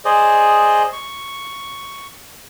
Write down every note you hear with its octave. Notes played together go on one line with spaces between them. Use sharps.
G#4 C5 D5 D#5
C#6